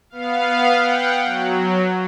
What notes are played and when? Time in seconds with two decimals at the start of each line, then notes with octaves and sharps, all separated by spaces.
0.10 B3 F5
0.76 F#5 G5
1.24 F#3